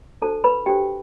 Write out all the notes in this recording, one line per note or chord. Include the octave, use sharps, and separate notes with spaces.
D4 F#4 A4 C5 A5
B4 B5
D4 F#4 G4 A4 C5 G5